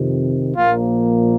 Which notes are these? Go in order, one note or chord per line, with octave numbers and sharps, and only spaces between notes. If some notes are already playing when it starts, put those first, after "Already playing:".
Already playing: F2 C3 D#3
A#1 A#2 F3 A#3 F4